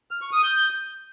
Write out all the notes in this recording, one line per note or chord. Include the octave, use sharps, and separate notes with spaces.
F6
C#6
D#6
G6